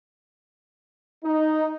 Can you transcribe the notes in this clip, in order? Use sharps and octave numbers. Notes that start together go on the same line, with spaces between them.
D#4